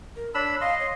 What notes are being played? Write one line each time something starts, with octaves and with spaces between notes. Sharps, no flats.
A#4
D4 C#5 B5 E6
D#5 F5 C6
C#5